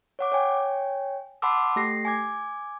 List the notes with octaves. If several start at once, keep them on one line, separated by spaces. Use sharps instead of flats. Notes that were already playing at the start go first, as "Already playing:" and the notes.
C#5 F#5 D6
C#5 G5 G#5
F#5 A5 B5 C6 D6 E6
A3 G4 A#6 C7
G#5 D6 G#6